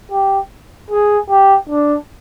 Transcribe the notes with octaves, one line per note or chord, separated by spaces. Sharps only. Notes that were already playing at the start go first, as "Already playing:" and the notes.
G4
G#4
G4
D4